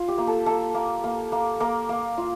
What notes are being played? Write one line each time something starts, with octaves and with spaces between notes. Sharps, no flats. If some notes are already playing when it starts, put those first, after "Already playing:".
Already playing: F4
G4
A#3
A4
A#3 A4
A#3
A#3
A#3
A#3 A#4
A#3
F4